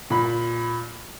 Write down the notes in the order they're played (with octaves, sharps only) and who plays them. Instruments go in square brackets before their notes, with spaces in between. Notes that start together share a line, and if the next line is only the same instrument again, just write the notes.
[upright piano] A#2 B5